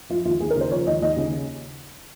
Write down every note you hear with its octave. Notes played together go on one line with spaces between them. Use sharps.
F3 F4
D#2 F4
D#2 G#4
A#4
C#3 C5
F3 C#5
D#2 D#5
D#2 D#5
C#3